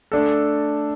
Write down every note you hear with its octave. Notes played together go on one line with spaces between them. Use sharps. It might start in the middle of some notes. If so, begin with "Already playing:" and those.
A3 D4 A4